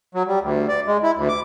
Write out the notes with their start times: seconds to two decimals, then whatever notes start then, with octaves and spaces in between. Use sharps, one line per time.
0.15 F#3
0.27 G3
0.42 D2
0.68 D5
0.87 G#3
1.03 E4
1.16 D2
1.29 D6